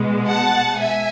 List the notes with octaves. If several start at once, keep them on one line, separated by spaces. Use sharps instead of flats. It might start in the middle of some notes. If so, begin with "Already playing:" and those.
Already playing: B2 G#3
F#5 A5
E5 G#5